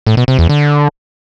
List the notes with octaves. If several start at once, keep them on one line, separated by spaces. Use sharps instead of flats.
A2
B2
C3
E2
D3